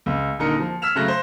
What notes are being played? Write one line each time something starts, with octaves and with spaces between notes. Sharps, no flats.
C#2
D#1 D3 D#4 A#4 C#7
F3
E6 F6 B6 E7 F7
C#3 F#3 A3 F#6 A#6
C5